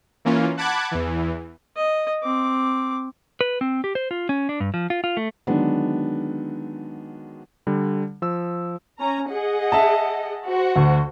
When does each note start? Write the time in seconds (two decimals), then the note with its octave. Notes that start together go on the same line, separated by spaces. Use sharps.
0.25 E3 A#3 C#4 F4
0.57 F#5 A5 B5 D6 F#6 G#6
0.91 E2 E3
1.77 D#5
2.24 C4 D6
3.41 B4
3.61 C4
3.84 G4
3.95 C5
4.11 F4
4.29 C#4
4.49 D4
4.60 G2
4.74 F3
4.90 F4
5.04 F4
5.17 A3
5.47 D3 D#3 F#3 G#3 B3 D4
7.67 D3 G3
8.22 F3 E6
8.99 C#4 A#5
9.30 G#4 D#5 F#5
9.72 E5 A5
10.46 F#4 C5
10.76 D2